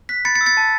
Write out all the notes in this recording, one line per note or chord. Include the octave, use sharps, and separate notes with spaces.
F#6 B6
B5 A6 C#7
A6 C#7
E6
A6 C#7
A5